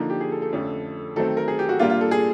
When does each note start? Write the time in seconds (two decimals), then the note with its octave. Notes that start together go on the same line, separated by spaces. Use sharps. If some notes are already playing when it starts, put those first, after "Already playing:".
Already playing: D3 F3 A#3 D#4
0.10 G4
0.21 G#4
0.32 A4
0.42 A4
0.53 F2 D3 F3 A3 C#4
1.16 D#3 F#3 A3 C4 A4
1.37 A#4
1.48 G#4
1.59 G4
1.69 F#4
1.79 A#2 G3 A#3 D4 F4
1.90 F4
2.01 A4
2.11 G#4